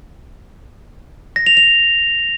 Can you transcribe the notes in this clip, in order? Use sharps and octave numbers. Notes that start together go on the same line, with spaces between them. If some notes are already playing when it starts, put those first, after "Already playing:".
A#6
F7
F7